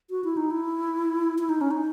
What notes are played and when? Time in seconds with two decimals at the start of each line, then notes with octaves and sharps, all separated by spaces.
0.10 F#4
0.24 E4
0.37 D#4
0.51 E4
1.38 E4
1.49 D#4
1.61 C#4
1.71 D#4